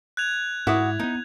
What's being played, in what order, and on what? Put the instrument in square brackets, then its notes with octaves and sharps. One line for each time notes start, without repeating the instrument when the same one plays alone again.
[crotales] F#6 G#6 F7
[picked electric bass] G#2 [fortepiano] E4 [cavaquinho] F#4 D6 D#6
[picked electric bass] A#3 B3 [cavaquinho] D#4